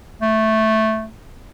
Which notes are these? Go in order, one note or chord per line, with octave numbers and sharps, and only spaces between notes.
A3